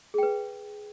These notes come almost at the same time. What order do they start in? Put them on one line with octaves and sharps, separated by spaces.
G#4 G5 B4